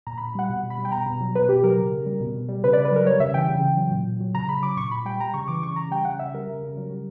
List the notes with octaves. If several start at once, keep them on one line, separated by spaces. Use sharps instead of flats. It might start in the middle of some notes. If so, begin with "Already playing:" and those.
A#2 A#5
B5
A#2
G3 F#5
B2
B2
B5
G3
G5
B2 A#5
B2
F#3
B2 B4
B2 G4
F#3 A#4
C#3
C#3
G3
B2
B2
G3
C#3 B4
D5
C#3
B4
F#3 A#4
G3 C#5
C#3 E5
E3 G5
C#3
C#3
F#3
A#2
A#2
F#3
C#3 A#5
C#3 B5
F#3 D6
A#2 C#6
A#2 B5
G3 G5
G3 A#5
C#3 C#6
E3 D6
C#3 C#6
C#3 A#5
G3 G5
C#3 F#5
C#3 E5
G3 A#4
C#3
C#3
F#3
G3